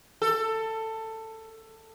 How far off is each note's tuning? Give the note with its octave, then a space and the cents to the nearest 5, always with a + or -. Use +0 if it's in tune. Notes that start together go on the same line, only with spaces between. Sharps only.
A4 +15